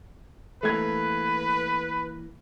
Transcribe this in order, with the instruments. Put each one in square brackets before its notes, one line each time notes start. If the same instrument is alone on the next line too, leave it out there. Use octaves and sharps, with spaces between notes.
[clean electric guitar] E3 A#3 [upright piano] A3 G#6 [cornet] B4